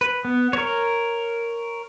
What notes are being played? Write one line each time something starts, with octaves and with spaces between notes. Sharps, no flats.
B4
B3
A#4 C#5